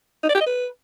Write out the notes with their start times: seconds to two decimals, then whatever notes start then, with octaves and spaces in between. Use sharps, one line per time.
0.23 D#4
0.29 D5
0.35 G4
0.41 D#5
0.46 B4